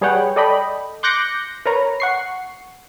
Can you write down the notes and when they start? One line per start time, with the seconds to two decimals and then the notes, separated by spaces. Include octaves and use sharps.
0.01 G3 G#4 B4 C#5 F#5 G5
0.36 A4 D5 D#5 G5 B5
1.03 C6 D6 F#6 G6 A#6 C#7
1.66 A#4 B4 C#5 A#5
2.00 F#5 C#6 C7